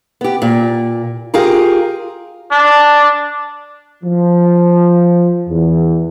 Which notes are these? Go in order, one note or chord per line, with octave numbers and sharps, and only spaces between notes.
B3 G4
A#2
F4 G4 G#4 A#4
D4
F3
E2